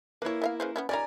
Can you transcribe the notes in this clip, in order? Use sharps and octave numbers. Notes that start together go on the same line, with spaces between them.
A#3 E4 B4 C#5
B3 D#5 F5
C#3 B4 C5
B3 C#4 E4
D#3 G3 C#4 D5 G#5 A#5